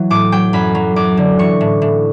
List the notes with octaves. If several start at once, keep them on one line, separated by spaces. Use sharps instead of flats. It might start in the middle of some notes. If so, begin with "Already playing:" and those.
Already playing: E3 F#3
A2 D6
F#3 G5
F#2 B5
F#3
F#2 D6
D3
E3 C#6
A2
A2